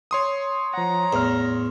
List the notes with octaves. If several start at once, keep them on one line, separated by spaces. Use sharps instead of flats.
C#5 C6 D#6
F3 F#5 A#5
E2 A2 F6